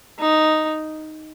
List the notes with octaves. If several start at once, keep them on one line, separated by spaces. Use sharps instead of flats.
D#4